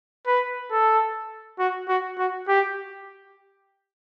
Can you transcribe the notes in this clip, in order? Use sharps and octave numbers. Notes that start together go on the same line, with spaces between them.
B4
A4
F#4
F#4
F#4
G4